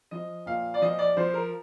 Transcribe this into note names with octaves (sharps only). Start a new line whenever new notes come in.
F3 D#5
A#2 F5
D5
F3 D#5
D5
F3 C5
A#4